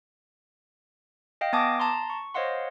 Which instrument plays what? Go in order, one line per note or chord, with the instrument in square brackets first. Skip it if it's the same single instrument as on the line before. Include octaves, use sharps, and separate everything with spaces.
[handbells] D#5 F5 G5
B3 G#5 A5 D6 D#6 A#6
A5 A#5 C6
C#6
C5 C#5 D#5 F5 F#5 C6